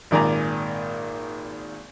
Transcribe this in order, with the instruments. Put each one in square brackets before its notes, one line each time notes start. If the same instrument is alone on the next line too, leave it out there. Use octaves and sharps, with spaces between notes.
[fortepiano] G#1 A#2 D#3 D5 G#5 A#5